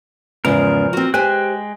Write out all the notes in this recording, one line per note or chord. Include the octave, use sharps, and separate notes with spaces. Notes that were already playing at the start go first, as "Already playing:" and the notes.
E2 G#2 C#3 F3 A#4
C4 F#4
G#3 G4 C5 G5 G#5 F#6